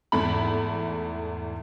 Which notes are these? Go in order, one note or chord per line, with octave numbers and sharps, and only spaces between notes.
E2 G#2 A3 B5